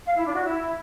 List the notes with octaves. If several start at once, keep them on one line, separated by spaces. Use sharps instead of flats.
F5
E4
D4
F#4
E4